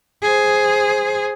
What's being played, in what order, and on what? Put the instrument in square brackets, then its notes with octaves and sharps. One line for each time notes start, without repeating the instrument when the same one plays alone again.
[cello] G#4 C5